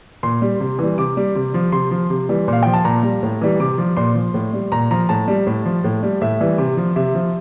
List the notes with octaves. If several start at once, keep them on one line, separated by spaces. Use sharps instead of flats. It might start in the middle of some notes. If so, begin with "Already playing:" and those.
A#2 C6
G3
C3
E3 G3
C3 D6
G3
C3
F3
C3 C6
F3
C3
E3 G3
A#2
F5
F3 G5
A5
A#2 A#5
G3
A2
E3 G3
C3 D6
F3
A#2 C6
F3
A2
G3
A#2 A#5
F3 A#5
A2 A5
G3
A2
F3
A2
G3
A2 E5
E3 G3
C3
F3
C3 E5
F3